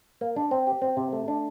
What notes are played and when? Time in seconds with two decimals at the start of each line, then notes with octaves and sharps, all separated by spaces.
0.21 A#3
0.36 D4
0.51 C4
0.67 G4
0.82 C4
0.97 C3
1.13 A3
1.28 D4